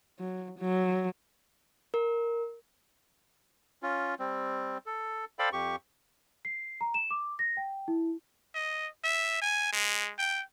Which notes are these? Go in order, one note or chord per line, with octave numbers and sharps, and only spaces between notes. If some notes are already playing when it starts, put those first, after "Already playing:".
F#3
F#3
A#4
C#4 F4
G3 C4
A4
A4 C5 D5 F5 G5 B5
F2 G4 C#6
C7
A#5
E7
D6
A#6
G5
E4
D#5
E5
G#5
G#3
G5